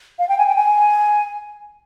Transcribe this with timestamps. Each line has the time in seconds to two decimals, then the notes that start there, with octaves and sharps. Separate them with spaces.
0.19 F5
0.29 G5
0.38 G#5
0.47 G5
0.56 G#5